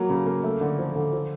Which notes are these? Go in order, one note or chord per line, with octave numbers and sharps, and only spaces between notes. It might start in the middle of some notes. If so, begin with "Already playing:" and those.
Already playing: F#3 A#3
C#3
A#3
A3
D3
F3
D3
F3